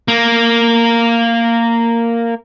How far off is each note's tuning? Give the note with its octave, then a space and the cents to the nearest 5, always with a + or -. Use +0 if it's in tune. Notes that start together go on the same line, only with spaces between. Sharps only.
A#3 -10